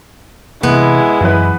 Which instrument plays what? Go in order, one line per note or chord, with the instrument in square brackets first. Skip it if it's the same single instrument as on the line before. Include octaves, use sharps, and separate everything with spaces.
[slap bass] C3 E3 [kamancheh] G#3 E4 [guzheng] B3
[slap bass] F#2 [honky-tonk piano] E3 B4